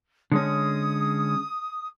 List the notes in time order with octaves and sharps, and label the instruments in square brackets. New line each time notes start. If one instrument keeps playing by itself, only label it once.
[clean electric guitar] D3 G#3 C#4 [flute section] D#6